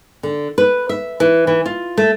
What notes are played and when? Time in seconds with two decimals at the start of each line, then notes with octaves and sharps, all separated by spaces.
0.23 D3
0.58 B4
0.89 E5
1.20 E3
1.47 E3
1.66 F4
1.98 A3